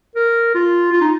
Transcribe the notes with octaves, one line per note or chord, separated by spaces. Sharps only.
A#4
F4
F4
D#4